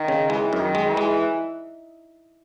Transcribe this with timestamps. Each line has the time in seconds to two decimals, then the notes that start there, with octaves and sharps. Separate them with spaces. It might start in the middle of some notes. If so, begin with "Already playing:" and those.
Already playing: D#3
0.08 C#3
0.30 E3 G#3
0.53 F#2
0.60 D#3
0.75 G#3
0.90 E3
0.97 G#3